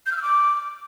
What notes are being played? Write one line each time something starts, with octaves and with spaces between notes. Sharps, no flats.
G6
F6
E6
D6